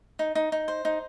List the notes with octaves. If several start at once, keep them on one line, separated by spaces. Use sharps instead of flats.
D#4
D#4
D#4
C5
D#4